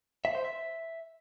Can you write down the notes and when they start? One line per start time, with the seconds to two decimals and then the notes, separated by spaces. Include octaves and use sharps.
0.25 E5
0.35 C5
0.45 E5